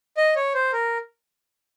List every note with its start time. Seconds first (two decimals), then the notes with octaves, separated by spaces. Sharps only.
0.17 D#5
0.36 C#5
0.54 C5
0.73 A#4